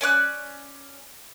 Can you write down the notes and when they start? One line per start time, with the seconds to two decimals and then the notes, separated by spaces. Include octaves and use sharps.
0.01 C#4 D5 C#6 F#6